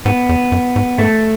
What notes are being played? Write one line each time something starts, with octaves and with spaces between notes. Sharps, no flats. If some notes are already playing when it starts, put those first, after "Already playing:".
G#2 B3
E2
F#2
G#2
G#2 A3